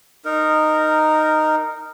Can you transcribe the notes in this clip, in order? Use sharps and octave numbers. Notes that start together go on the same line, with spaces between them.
D#4 A#4